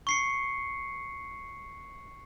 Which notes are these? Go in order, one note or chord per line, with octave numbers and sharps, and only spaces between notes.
C#6 C7 C#7